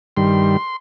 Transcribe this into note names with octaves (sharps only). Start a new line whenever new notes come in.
G2 D#3 G3 C6